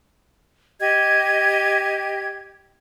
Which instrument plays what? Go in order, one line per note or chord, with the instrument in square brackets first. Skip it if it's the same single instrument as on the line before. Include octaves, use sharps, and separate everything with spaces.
[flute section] G4 D#5 G#6